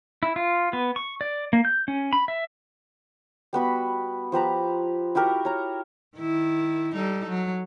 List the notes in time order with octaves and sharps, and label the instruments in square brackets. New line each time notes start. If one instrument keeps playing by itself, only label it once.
[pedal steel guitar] E4
F4
B3
C#6
D5
A#3
G6
C#4
B5
E5
[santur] G3 B3 F#4 B5
F3 G4 B4 A#5
E4 F#4 G4 A#4
C#5 A#5
[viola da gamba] D#3 E4
G3 D#4 A4
F#3